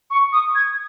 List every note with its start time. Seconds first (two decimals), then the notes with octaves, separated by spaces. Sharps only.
0.11 C#6
0.33 D#6
0.55 G#6